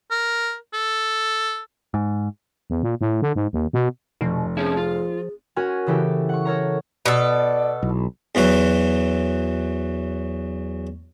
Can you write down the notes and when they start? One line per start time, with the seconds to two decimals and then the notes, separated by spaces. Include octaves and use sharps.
0.11 A#4
0.73 A4
1.94 G#2
2.70 E2
2.83 A#2
3.01 A2
3.22 D3
3.36 G#2
3.53 D#2
3.73 B2
4.21 F1 B2
4.57 F3 C4 C#4 E4 G#4
4.77 F4
5.56 C#4 F#4 A#4 G#5
5.87 C#3 E3 G4 A4
6.29 F#5 C#6
6.45 A4 A#4 C#5 A#5
7.06 B2 A4 D5
7.83 B1 E4
8.35 E2 E3 F#3 F#4